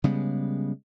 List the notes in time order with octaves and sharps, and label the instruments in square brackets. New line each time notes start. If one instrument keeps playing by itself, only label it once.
[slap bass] C#3 G3 G#3 B3